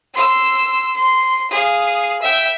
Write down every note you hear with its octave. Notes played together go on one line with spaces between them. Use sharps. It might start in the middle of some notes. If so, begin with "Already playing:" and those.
C6 E6
C6
G#4 F5
E5 G5